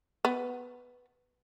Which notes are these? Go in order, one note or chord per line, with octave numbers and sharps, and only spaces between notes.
B3